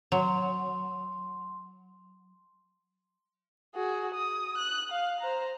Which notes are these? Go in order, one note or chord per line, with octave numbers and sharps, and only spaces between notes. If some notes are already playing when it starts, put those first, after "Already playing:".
F#3 C6
F#4 G#4
D#6
F#6
F5
C5 A#5